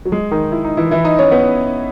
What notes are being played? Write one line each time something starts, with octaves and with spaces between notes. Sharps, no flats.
F#3
G#3
D#3 D#4
E4
D#4
E3 E4
E3 E4
D#4 D#5
C#4 C#5
B3 B4